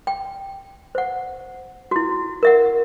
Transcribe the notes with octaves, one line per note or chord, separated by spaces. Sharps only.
G5
C5 F#5
E4 F#4
A#4 E5 F#5